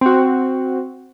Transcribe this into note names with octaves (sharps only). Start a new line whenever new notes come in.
C4 F#4